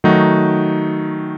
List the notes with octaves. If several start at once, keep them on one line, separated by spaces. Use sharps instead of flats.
D#3 F#3 A3 D#4 F#4